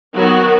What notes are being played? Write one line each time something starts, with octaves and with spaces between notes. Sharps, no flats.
D#3 F#3 B3 F#4